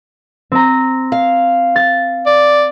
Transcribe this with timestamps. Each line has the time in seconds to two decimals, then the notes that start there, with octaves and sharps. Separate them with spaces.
0.52 C4 A#5
1.12 F5
1.76 A6
2.26 D5